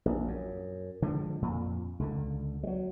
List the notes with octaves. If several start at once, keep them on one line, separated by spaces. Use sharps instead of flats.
A#1
F#2
D3 F3 G#3
F2 A#2
C#2 D3
F#3 G3